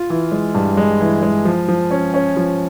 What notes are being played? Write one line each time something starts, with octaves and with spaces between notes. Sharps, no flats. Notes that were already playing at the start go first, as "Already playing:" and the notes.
Already playing: F4
E3
G#3
G2
G#3
E3
G#3
F3
F3
C#4
C#4
F3